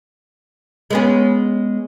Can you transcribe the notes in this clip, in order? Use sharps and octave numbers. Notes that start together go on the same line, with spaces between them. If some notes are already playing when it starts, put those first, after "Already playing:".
G#3 B3 C#4